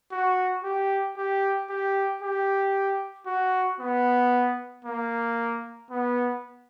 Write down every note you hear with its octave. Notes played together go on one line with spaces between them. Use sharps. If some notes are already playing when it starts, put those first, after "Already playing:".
F#4
G4
G4
G4
G4
F#4
B3
A#3
B3